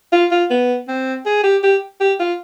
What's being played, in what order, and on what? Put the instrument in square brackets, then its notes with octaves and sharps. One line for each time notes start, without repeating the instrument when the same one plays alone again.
[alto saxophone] F4
F4
B3
C4
G#4
G4
G4
G4
F4